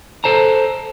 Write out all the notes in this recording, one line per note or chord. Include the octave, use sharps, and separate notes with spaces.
A4 C5 A5 A#5